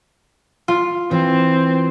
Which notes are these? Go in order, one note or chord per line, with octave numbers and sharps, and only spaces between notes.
F4
E3 C4